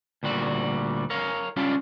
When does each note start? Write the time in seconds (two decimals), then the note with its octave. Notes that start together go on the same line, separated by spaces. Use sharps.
0.23 D2 A#2 G3 F#4
1.10 A#4 C#5 F5
1.57 G3 C#4 D4 F4